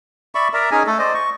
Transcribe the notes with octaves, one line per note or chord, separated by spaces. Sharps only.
D5 E5 B5 C#6
A#4 D5 E5 A#5
C#4 D#4 G#4 G#5
A3 A4
C5 D5 D#5
C#6